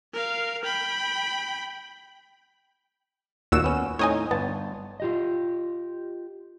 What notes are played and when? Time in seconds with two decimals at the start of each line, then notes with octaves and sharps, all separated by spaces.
0.14 A#4 F5
0.63 G5 B5
3.52 D#2 A#2 F#4 F#5 E6 E7
3.64 B3 C#4
3.99 A2 C4 D#4 C#5 D#5 G#5
4.31 G1 B3 A5
5.00 F4 G4 D#5